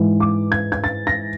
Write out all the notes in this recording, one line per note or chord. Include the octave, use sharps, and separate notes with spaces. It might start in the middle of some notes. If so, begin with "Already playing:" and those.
Already playing: G#2 E3
D6
G#6
G#6
A6
A#6